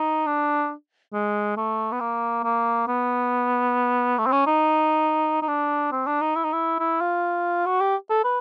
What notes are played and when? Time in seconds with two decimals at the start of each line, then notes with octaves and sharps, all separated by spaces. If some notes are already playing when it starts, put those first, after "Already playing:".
Already playing: D#4
0.26 D4
1.14 G#3
1.57 A3
1.92 B3
2.00 A#3
2.44 A#3
2.88 B3
4.18 A3
4.26 C4
4.32 C#4
4.47 D#4
5.42 D#4
5.48 D4
5.92 C4
6.07 D4
6.21 D#4
6.36 E4
6.44 D#4
6.53 E4
6.79 E4
7.01 F4
7.66 F#4
7.81 G4
8.10 A4
8.24 B4